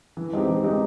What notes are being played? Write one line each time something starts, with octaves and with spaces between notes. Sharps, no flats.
E3
G#3 C4 D#4 G4
E3
G#3 C4 D#4 G4